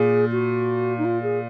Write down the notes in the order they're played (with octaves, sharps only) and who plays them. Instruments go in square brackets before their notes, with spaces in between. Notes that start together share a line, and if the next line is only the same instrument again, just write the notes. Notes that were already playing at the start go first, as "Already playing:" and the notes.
Already playing: [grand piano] A#2 [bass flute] G#4
[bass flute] F#4
D#4
F4
G#4